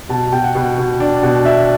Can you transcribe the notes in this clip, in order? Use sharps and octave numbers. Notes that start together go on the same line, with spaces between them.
B2 A5
B2 G5
F#5
B2
B2
D4
B2
D4 E5